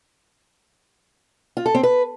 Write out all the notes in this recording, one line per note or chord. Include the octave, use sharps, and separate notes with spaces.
F4
A4
C4
B4